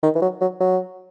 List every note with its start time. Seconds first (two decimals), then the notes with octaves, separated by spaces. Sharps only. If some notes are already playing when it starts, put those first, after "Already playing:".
0.03 D#3
0.15 E3
0.22 F#3
0.41 F#3
0.60 F#3